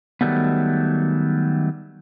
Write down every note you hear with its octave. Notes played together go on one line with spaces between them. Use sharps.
D#3 F#3 G3 A3 B3